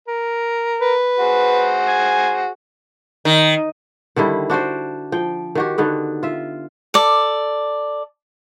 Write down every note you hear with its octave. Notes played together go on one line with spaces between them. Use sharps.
A#4
B4
F#4 G#4 C5
G#5
D#3
D3 D#3 G3 E4
D4 F#4 C5 D5
F3 G5
D#3 F#4 G4
D3 D#3 B3
F4 E5
A4 D5